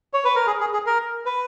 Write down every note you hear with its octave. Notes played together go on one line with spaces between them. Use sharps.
C#5
B4
A#4
G#4
G#4
G#4
A#4
B4